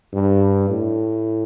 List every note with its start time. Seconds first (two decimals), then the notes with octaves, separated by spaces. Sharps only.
0.13 G2
0.69 A2